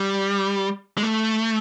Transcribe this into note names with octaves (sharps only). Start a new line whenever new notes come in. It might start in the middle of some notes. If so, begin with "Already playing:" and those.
Already playing: G3
G#3
A3